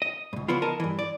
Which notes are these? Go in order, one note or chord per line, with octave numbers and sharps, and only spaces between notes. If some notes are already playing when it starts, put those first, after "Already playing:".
D#5
C#2 G2
C#3 F3 B3 E4 F4
A#4 D#5 A5
G2 E3
D5